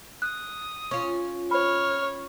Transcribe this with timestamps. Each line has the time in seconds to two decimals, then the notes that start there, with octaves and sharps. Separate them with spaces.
0.22 D#6 F#6
0.91 C#4 F4 C#6
1.51 C#5 B5 F6